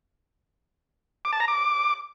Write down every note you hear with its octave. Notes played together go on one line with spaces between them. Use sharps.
D6
A5
A#5
D6